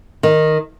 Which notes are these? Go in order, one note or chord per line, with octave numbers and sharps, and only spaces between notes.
D#3